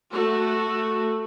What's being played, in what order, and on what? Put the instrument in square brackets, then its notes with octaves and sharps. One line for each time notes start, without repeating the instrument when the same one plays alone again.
[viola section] A3 F#4